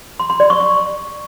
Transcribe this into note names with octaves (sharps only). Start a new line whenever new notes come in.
C6
C6
D5
C#6
C#6